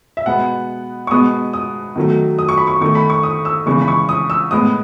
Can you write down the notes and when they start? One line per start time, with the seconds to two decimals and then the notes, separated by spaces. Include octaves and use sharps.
0.17 E5
0.26 B2 G#3 B3 F#5
1.07 C#6
1.11 B2 G#3 B3 D#6
1.53 D#6
1.96 D#3 F#3 A3
2.39 D#6
2.49 C#6
2.57 B5
2.67 C#6
2.81 D#3 A3 C#6
2.95 B5
3.10 C#6
3.23 D#6
3.45 E6
3.66 C#3 E3 G#3 C#6
3.82 B5
3.88 C#6
4.09 D#6
4.30 E6
4.51 A2 G#3 B3 D#6